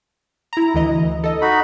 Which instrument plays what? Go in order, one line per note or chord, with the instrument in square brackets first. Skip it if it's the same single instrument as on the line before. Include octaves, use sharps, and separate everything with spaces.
[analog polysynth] E4 A#5
D2 E3 D#5
A4 D#5
[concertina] D#4 F#4 B5